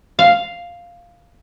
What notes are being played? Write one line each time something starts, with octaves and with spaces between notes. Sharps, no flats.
F5